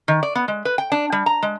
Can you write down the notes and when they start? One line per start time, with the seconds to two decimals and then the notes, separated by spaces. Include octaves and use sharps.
0.08 D#3
0.23 D5
0.35 B3
0.48 G#3
0.65 B4
0.78 G5
0.92 D4
1.12 G3
1.26 A#5
1.43 G#3